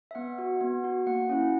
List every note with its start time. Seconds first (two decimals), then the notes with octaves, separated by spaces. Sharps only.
0.11 E5
0.15 B3 F#5
0.38 F#4
0.61 B3
0.84 F#4
1.07 A#3 F#5
1.29 C#4 E4